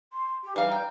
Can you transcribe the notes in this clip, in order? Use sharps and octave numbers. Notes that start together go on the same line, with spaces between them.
C6
G4
E3 G3 F5 A#5
G5